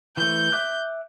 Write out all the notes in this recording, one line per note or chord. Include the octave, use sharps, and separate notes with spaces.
E3 A3 G6
E5 D6 F#6